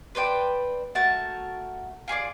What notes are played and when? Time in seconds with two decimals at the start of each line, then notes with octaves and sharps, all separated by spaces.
0.15 B4 C5 D5 G5
0.95 A3 F#4 A#4 A5
2.08 F4 G#4 C#5 D5